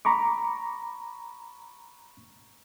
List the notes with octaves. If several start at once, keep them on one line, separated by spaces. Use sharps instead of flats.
A#5 B5 C#6 D6